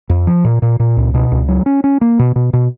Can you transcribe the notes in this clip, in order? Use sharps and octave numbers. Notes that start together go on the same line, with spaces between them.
F2
F3
A#2
A#2
A#2
C#2
B2
C#2
F#3
C#4
C#4
A#3
B2
B2
B2